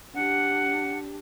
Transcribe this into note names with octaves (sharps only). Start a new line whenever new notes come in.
D4 G4 F#5